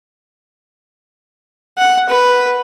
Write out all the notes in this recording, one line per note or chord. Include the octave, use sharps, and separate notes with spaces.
F#5
B4